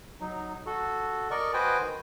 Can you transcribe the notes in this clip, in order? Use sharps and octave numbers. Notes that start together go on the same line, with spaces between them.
F#3 D#4
F#4 A4
A#4 D5 D#5 C#6
F#4 B4 C5 D#5 G5 G#5
D#3